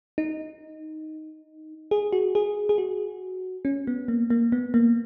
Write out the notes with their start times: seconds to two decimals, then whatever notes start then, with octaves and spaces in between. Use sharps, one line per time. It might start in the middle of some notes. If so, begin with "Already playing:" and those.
0.18 D#4
1.91 G#4
2.13 F#4
2.35 G#4
2.69 G#4
2.78 F#4
3.65 C#4
3.87 B3
4.08 A#3
4.30 A#3
4.52 B3
4.74 A#3